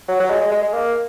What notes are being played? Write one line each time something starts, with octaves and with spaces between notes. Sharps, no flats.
F#3
F#3
G#3
G#3
G#3
G#3
A#3